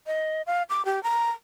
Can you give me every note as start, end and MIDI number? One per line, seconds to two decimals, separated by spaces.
0.07 0.42 75
0.47 0.63 77
0.69 0.85 86
0.85 1.02 67
1.03 1.30 82